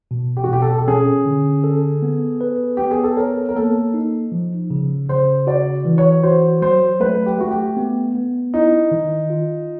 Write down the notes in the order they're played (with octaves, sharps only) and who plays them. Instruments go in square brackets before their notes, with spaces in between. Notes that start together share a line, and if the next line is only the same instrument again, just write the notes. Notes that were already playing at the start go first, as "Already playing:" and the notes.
[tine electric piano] B2
[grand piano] G4
F#4
[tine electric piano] B2 [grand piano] G4
[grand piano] A4
A4
[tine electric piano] C#4 [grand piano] G#4
[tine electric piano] D3
A4
B3
B4
[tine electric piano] B3 [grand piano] G4
[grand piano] G#4
A4
[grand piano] A#4 [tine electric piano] C#5
[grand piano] A#4
[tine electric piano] A#3 [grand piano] A4
[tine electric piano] D#4
F3
C#3
[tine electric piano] C#3 [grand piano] C5
[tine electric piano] F#4 [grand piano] D5
[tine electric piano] E3
[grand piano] C#5
[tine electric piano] F#4 [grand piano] C5
[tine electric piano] F#3 [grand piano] C5
[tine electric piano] A3 [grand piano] B4
[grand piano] G4
[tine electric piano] A3 [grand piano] F#4
[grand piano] G4
[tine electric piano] B3
B3
[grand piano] D#4 [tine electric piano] E4
[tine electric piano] D#3
F4